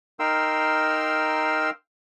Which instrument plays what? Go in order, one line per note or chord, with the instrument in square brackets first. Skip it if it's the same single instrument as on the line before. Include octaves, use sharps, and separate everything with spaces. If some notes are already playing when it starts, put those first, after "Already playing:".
[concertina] D#4 A#4 F5 G5 C6 E6